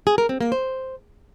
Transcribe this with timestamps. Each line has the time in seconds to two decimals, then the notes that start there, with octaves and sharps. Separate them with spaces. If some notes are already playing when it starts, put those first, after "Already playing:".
0.07 G#4
0.18 A#4
0.29 C4
0.41 A#3
0.52 C5